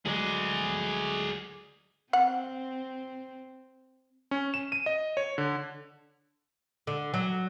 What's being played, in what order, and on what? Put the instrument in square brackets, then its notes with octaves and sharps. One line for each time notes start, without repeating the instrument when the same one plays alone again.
[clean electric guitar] D2 F#3 G#3 [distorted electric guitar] G#4 D5
[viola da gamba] C4 [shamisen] F#5
[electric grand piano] C#4
E7
D#7
D#5
C#5
D3
[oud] D3
F#3